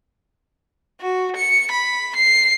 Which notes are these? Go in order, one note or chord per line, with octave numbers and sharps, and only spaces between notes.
F#4
C#7
B5
C7